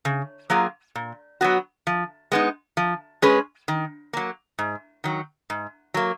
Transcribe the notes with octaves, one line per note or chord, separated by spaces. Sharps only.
C#3
F#3 A#3 F4 G#4
A#2
F#3 B3 F#4
F3
G#3 B3 D#4
F3
G#3 C#4 G#4 B4
D#3
F#3 A#3
G#2
D#3 F#3
G#2
F#3 A#3